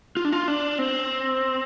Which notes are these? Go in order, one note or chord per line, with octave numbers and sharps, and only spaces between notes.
F4
D4
F4
D4
C4